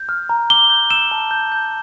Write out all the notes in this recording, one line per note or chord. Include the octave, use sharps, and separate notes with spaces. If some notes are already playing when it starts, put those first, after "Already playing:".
Already playing: G6
F6
A#5
D6 G7
G6
E6 E7
A5
G6
G6